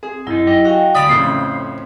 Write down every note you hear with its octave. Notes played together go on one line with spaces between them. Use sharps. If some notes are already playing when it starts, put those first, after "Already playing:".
C4 G#4
F#2 F#3 D#4 E4
G4 D#5
F#4 F5 G5 G#5
D2 G4 D5 B5 D#6
F2 A2 C#3 C5 C6